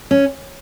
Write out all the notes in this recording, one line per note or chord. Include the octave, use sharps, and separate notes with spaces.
C#4